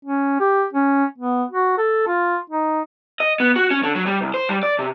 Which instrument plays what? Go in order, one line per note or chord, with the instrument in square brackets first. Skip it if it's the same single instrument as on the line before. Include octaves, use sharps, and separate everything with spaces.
[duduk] C#4
G4
C#4
B3
F#4
A4
F4
D#4
[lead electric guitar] D#5
B3
F#4
C#4
D3
F#3
G3
C2
C5
G3
D5
C3